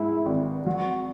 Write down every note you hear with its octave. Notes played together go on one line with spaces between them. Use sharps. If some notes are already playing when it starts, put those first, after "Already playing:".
Already playing: G#2 G#3 E4
G#1
F#3 F#4